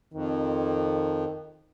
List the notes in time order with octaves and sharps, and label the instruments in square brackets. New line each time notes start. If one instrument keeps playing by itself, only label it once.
[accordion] F2 [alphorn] D#3